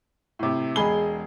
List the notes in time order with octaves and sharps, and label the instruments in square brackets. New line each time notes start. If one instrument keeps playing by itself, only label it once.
[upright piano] A2 C3
E1 G#3 G#4 B5 G7